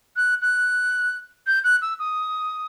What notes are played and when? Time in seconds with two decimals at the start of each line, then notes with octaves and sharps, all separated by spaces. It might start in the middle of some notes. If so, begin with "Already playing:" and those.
0.16 F#6
0.41 F#6
1.47 G6
1.64 F#6
1.82 E6
1.99 D#6